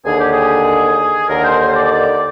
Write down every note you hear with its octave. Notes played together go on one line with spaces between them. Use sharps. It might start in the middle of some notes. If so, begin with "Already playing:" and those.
D#2 D3 G#4
G4
G#4
D#2 D3 A#4
C5
C5
D5
D5